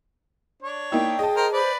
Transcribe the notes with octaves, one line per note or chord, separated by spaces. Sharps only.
D4 C#5
A#3 D#4 E4 G5
G#4 D#5 A5
A#4 C5 G5
B4 C5 D5